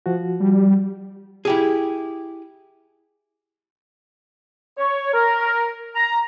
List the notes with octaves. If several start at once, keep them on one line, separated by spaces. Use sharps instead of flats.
F3 F#4
G3
E4 G4 G#4
C#5
A#4
A#5